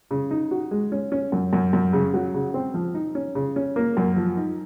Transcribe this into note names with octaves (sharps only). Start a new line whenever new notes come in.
C#3
D#4
F#4
G#3
C#4
C#4
F#2
F#2
F#2
C#3
F#3
C#3
C4
F3
D#4
C#4
C#3
C#4
A#3
F#2
F3
D#4